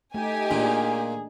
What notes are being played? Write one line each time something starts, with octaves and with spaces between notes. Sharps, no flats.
A3 D#4 G4 G#5
A#2 D4 G#4